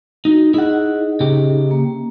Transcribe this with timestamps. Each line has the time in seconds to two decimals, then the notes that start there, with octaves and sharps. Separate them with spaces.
0.25 D#4 F#4
0.54 D#4 E4 G#4 D#5 F#5
1.20 C#3 G4
1.71 A#3